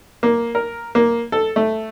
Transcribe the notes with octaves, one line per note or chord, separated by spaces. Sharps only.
A#3
A#4
A#3
A4
A3